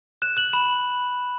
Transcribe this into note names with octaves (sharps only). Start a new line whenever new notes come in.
F#6 E7
F#6 F#7
B5 E7